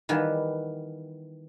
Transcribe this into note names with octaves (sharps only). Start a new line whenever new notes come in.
D#3 E3 G3 B3